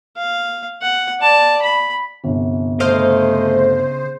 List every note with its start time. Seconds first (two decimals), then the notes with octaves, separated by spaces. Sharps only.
0.18 F5
0.82 F#5
1.20 D5 A5
1.62 B5
2.24 G1 C2
2.80 C#3 A3 C5 D#5 F5